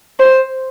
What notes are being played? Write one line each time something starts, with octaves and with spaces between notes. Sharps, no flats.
C5